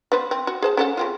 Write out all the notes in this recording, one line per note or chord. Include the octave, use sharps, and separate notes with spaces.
B3 B4 C5
C4
F#4
G#4 C5 A5
C#4 A4 F#5
C#3 C4 F4